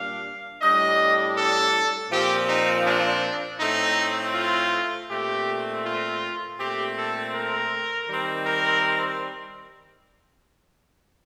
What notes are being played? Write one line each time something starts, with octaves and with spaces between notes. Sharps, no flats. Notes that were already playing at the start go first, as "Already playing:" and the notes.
Already playing: A#2 G3 D4 F5
A2 G3 D4 D#5
A4
A#2 F3 C4 G4
D#4
D4
A2 A3 C4 D#4
F4
A#2 A3 C4 G4
F4
A#2 A3 C4 G4
A4
A#4
D#3 G3 C4
A#4